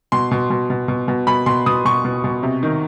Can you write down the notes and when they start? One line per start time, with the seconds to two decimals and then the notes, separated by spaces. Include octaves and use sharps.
0.12 B2 C6
0.31 B2
0.50 B2
0.70 B2
0.88 B2
1.08 B2
1.27 B2 B5
1.46 B2 C6
1.66 B2 D#6
1.85 B2 C#6
2.05 B2
2.24 B2
2.43 C3
2.63 D#3